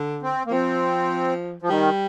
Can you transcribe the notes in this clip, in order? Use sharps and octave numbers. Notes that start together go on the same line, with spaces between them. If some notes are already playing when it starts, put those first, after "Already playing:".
Already playing: D3
C4
A#3
F3 C4
F3
D#3 G3